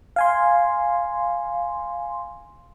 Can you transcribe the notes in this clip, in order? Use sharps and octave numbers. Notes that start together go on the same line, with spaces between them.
F5 G#5 C6